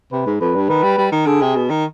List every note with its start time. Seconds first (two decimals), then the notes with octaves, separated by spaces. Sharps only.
0.12 C3 B4
0.26 G#2
0.40 F2 B4
0.55 G2
0.69 D#3 B4
0.83 G3
0.98 G3
1.12 D#3
1.26 D3 G#4
1.42 C3
1.55 B2
1.70 D#3